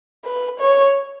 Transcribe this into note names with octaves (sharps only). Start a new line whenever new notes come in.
B4
C#5